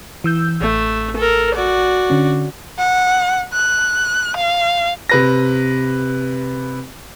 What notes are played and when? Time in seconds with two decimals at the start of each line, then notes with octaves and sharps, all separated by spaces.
0.24 E3 E6 G6
0.61 A1 A3
1.17 A4 A#4
1.55 F#4 D5
2.10 D3 C#4
2.78 F#5
3.53 F#6
4.36 F5
5.09 C3 B4 A#6